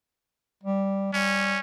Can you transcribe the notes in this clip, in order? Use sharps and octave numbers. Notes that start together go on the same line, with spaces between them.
G3
G3 C#4